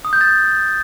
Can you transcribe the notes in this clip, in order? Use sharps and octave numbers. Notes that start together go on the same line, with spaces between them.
D#6
G6
A6